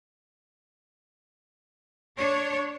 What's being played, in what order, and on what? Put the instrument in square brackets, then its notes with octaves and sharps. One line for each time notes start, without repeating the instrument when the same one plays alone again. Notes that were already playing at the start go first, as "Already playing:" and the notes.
[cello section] D4 C#5